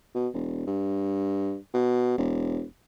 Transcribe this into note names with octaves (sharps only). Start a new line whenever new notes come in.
B2
E1
G2
B2
E1